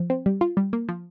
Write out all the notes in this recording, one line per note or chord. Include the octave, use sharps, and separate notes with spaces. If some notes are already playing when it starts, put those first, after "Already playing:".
Already playing: F3
C4
G3
F4
G3
A#3
F3